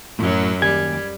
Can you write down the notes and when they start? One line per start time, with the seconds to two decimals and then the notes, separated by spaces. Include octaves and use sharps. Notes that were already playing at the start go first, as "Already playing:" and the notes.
0.19 F#2 A2 F#3
0.62 D#2 G3 G4 G#5 G#6